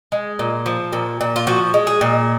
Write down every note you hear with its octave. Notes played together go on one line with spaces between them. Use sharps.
G#3
A#2
F3
A#2
A#2
F4
F3 F#4
G#3
G#4
A#2